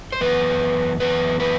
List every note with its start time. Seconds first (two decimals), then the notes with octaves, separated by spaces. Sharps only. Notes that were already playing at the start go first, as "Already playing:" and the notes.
0.12 C5
0.21 F#2 E3 B3 B4
1.00 F#2 E3 B3 B4
1.40 B4